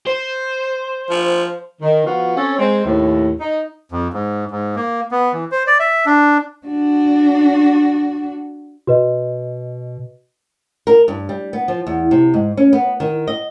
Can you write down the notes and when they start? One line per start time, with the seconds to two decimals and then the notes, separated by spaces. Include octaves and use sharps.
0.07 C5
1.10 F3
1.82 D#3
2.05 F3 B3 F4 F#4
2.37 C4 C#4 A4 C#5
2.58 G#3 C4
2.85 D#2 A2
3.40 D#4
3.92 F2
4.13 G#2
4.51 G#2
4.76 A#3
5.11 B3
5.33 E3
5.51 C5
5.67 D5
5.80 E5
6.06 D4
6.66 D4 F#4
8.87 B2 F#4 B4 D#5
10.87 A#4
11.08 G2
11.29 G3
11.53 B3
11.68 F3
11.87 E2
12.11 C3
12.34 G#2
12.57 C#4
12.73 B3
13.00 D#3
13.27 D#5